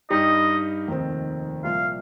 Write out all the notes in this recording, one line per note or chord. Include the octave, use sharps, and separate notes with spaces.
G2 G3 D#4 G4 D#5
F1 D#2 D#3 C4
C2 A#2 F3 F5